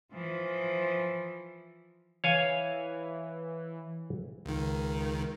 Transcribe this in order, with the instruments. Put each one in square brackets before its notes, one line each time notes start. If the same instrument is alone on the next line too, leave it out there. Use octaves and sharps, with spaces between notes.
[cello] E3 F3
[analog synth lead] E3 [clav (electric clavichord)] C#5 F5 G#5
[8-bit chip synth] C#2 D#3